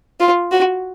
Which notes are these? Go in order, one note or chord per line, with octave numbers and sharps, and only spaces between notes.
F4
F#4